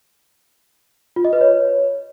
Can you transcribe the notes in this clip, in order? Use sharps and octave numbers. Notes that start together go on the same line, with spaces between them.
F4
D#5
B4
C#5